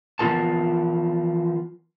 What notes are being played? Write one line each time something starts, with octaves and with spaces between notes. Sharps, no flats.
E3 F3 B3 F4 A#4 A5